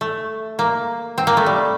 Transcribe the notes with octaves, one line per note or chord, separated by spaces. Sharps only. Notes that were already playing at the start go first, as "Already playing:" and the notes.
A3
A#3
C4
A#3
A3
G3